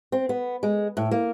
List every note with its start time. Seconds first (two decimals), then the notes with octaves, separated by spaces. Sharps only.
0.12 C4
0.29 B3
0.63 G#3
0.97 A2
1.11 A#3